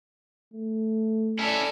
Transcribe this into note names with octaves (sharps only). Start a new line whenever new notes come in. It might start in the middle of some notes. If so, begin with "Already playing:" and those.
A3
C#4 E4 A4 D5